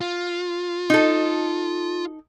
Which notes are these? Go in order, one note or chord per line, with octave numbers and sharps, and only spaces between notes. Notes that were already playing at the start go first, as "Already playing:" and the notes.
F4
D#4 A4